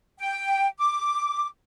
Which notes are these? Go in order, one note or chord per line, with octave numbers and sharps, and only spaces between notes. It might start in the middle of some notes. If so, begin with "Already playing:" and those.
G5
D6